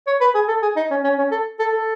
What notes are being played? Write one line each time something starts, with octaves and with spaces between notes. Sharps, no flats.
C#5
B4
G#4
A4
G#4
D#4
C#4
C#4
C#4
A4
A4
A4